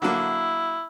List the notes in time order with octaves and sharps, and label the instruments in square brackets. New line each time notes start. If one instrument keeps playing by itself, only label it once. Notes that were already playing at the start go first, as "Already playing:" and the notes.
[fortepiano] D3 F#3 A#3 [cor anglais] E4